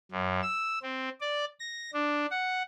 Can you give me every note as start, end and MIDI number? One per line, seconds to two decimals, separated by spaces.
0.11 0.41 42
0.43 0.79 88
0.82 1.09 60
1.21 1.45 74
1.59 1.90 94
1.94 2.26 62
2.31 2.63 78